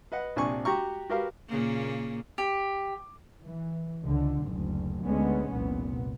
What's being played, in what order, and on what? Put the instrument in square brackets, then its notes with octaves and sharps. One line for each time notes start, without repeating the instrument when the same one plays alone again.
[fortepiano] B4 D#5 F#5
A#1 C3 D4 G#5 C#6
F#4 G4 G5 A#5 C#6
F#4 G4 A#4 B4 F5
[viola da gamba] A#2 C#3 A#3
[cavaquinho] G4
[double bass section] E3
C#2 D3
F#1 D2
D2 D3 G#3 B3 C#4
F1 C2 A#2 B3